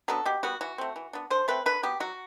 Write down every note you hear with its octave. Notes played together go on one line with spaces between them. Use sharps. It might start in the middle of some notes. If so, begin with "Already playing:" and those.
F#3 B3 D4 A4
B2 G4
G3 B3 F#4
E3 F#4
A3 C4
E3
B3 D4
D3 C5
A3 C4 B4
D3 B4
F#3 B3 G4
F#3 F#4